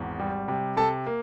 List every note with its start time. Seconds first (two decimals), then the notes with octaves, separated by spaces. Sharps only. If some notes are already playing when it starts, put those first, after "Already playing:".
Already playing: G#1 E2
0.20 G3
0.48 C3
0.77 C3 A4 A5
1.06 A#3